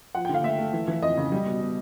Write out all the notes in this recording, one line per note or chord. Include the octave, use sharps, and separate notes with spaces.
F3 F#5
D3 G5
F5
A3 E5
A3
E3
E3
F2 D#5
C#3
G3
B2
B2